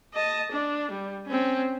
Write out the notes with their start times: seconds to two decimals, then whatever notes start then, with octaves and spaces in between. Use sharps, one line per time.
0.14 D#5 A5
0.52 D4
0.91 G3
1.27 C4 C#4